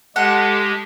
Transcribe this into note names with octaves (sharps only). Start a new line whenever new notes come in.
G#3 G4 A4 F#5